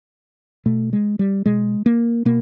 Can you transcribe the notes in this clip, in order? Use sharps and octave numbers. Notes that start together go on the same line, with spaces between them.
B2 A3
G#3
G3
B2 G#3
A#3
B2 A#3